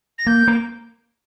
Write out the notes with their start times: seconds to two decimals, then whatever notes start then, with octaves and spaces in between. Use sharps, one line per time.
0.18 A#6
0.26 A#3 G6
0.47 A#3